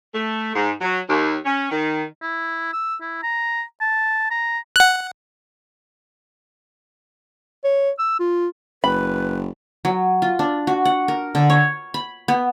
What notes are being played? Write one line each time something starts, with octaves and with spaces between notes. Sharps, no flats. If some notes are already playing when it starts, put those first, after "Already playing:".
A3
G#2
F#3
D#2
C#4
D#3
E4
E6
E4
A#5
A5
A#5
F#5 F#6
C#5
E6
F4
F#1 B4 B5
F#3
F4
D4
F#4
F#5
A#4
D3
C#5
B5
B3